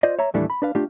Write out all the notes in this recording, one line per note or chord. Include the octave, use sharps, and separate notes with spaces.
F4 C5 D5 D#5
C#5 E5 A#5
D#2 A2 E3 G3 A3 D4
B5
D4 B4 F5
A3 D4 F4 G4